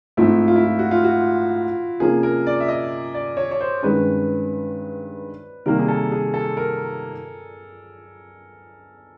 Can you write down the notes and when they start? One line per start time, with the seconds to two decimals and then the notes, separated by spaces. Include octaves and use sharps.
0.17 G#2 F3 A3 C4 E4
0.48 F4
0.56 E4
0.64 F4
0.79 F#4
0.91 F4
1.04 F#4
2.00 C3 F3 A#3 C#4 G#4
2.23 A#4
2.47 D5
2.60 E5
2.68 D#5
3.15 D5
3.37 C#5
3.51 C#5
3.61 C5
3.83 G2 D#3 G#3 C#4 B4
5.66 C3 D#3 G3 A#3 A#4
5.79 G#4
5.88 A4
6.12 G#4
6.34 A4
6.57 A#4